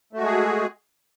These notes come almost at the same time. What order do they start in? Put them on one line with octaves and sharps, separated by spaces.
A3 F#4 G#3 G#4